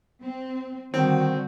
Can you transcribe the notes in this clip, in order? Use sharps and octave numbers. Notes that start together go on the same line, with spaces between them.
C4
D3 D#3 G3 C4 F#4